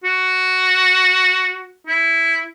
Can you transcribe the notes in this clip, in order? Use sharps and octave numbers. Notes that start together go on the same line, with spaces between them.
F#4
E4